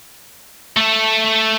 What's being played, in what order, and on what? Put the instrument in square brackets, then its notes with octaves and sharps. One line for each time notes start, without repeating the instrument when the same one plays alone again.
[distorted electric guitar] A3 A4